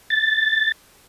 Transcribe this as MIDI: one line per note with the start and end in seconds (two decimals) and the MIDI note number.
0.10 0.72 93